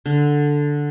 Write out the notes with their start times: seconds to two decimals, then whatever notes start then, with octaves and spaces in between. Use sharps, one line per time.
0.06 D3